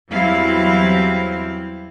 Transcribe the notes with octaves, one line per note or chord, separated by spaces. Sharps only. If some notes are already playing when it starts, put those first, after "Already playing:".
E2 F#3 G3 C4 E4 F5